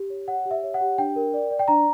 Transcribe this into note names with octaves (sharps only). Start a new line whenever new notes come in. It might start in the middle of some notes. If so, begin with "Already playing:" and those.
Already playing: G4
C#5
C#5 F#5
G4
E5
C#5
F#5
G4
D4 G5
A#4
D5
D5
G5
D4 A#5